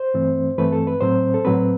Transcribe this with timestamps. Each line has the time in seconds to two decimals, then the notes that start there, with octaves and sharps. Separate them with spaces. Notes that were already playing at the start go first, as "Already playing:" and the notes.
Already playing: C5
0.14 G2 E3 A3 C4
0.58 G2 E3 A3 C4 B4
0.72 A4
0.87 B4
1.01 A2 F#3 C4 C5
1.34 A4
1.45 A2 F#3 C4 B4